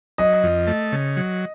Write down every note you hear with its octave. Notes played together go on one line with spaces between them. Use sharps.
F#3 D#5
F2
A3
C#3
F#3